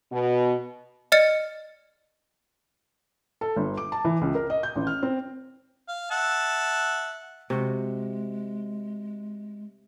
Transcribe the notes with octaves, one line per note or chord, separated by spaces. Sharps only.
B2
D5 D#5 F6 A6 C#7
A4
G1
D6
A5
E3
C#2
A#4
D#5
G6
A1
F6
C4
F5
E5 F#5 A5
C3 G#3 F#4